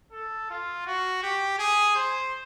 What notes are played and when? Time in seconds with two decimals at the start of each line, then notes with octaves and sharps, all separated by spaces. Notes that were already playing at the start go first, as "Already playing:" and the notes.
0.13 A4
0.50 F4
0.86 F#4
1.23 G4
1.59 G#4
1.96 C5